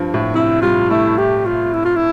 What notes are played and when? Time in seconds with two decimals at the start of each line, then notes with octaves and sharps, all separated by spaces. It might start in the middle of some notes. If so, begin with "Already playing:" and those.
Already playing: G2 F3
0.14 A2
0.34 C3 E4
0.62 G3 F4
0.90 A3 E4
1.18 G4
1.46 F4
1.74 E4
1.85 F4
1.96 E4